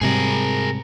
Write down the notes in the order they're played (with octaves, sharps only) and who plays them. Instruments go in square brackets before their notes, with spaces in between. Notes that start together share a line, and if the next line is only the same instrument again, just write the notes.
[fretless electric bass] G#2 C3 G3 [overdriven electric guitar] G#4 A#4